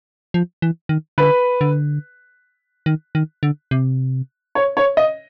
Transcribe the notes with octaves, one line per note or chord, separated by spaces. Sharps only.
F3
E3
D#3
D3 B4
D3
D#3
D#3
D3
C3
C#5
C#5
D#5